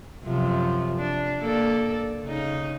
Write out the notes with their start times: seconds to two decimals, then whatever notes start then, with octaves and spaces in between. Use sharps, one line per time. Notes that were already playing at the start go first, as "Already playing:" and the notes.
0.25 F#2 C3 F3
0.99 D4
1.41 A#3 A4 D5
2.24 C#3 D#4